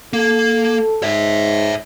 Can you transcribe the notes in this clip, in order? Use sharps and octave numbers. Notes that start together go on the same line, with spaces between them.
A#3 A4
G#2 C#5 E5